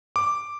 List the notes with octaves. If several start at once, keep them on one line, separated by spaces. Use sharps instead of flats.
D6